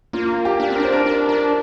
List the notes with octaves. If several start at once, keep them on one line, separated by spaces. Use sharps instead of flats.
A#3 F4
G4
D4
C4
A#4
D4 C5
A#4
D4
D4 A#4